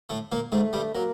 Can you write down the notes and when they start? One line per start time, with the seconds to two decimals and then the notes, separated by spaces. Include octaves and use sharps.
0.10 A2 A3
0.32 A#2 A#3
0.52 G#2 G#3 A3
0.73 G2 G3
0.94 F#3 A#3